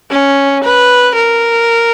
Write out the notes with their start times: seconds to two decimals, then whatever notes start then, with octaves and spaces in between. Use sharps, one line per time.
0.11 C#4
0.64 B4
1.15 A#4